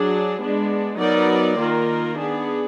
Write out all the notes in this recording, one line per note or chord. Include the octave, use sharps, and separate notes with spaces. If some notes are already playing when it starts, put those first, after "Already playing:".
Already playing: F#3 D4 G#4
G#3 B3 D4
F#3 B3 D#4 A#4 D5
D#3 A#3 F4 A#4
B3 D4 G#4